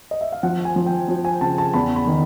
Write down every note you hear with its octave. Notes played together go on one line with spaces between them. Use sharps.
D#5
E5
F5
F3 F#5
G#5
F3
G5
F3
G#5
C#3 A5
A5
E2 B5
B5
D#3